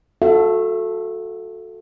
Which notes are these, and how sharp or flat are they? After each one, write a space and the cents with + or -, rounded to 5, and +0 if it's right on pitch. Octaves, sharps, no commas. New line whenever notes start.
F#4 -25 A4 +0 E5 +40